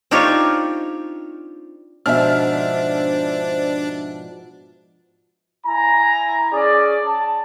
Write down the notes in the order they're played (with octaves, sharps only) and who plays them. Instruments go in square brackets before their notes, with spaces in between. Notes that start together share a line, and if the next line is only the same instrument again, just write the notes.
[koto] C4 D4 D#4 F4 G4 C#5
[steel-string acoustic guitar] G#2 B2 F3 [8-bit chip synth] D4 [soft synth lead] C5 [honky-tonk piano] E5 F6
[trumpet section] E4 G#5 A#5
C#4 G#4 D5
A5